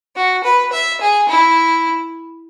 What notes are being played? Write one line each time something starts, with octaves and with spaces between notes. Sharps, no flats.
F#4
B4
E5
G#4
E4